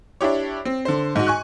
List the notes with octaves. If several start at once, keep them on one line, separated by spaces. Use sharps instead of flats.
D4 E4 G4 C#5
C4
D3 C5
G#2 F#4
G#5 C#6 F#6